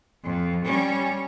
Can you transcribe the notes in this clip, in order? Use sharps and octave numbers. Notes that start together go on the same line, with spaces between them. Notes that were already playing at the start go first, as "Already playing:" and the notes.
F2
G3 C#4